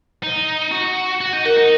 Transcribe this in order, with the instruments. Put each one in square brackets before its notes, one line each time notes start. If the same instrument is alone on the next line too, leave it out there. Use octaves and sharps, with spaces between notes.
[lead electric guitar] D#4
F#4
F#4
D#4
[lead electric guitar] F#4 [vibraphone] A#4
[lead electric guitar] D#4